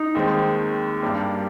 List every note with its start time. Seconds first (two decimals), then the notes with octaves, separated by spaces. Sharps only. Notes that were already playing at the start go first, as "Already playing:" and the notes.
Already playing: D#4
0.15 D#2 D#3 G#3 C4
1.02 G2 G3 A#3